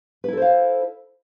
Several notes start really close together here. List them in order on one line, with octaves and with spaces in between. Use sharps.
B4 E4 A4 C5 F5